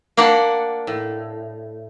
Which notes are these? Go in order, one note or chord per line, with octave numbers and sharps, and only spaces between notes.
A#3 D4 D5 F#5
A2